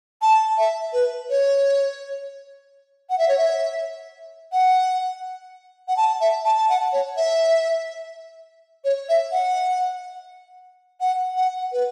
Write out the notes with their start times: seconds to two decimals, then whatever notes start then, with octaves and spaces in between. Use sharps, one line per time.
0.22 A5
0.58 E5
0.93 B4
1.30 C#5
3.10 F#5
3.18 E5
3.28 C#5
3.38 E5
4.52 F#5
5.88 F#5
5.97 A5
6.21 E5
6.45 A5
6.57 A5
6.69 F#5
6.93 C#5
7.17 E5
8.84 C#5
9.09 E5
9.32 F#5
11.01 F#5
11.36 F#5
11.72 B4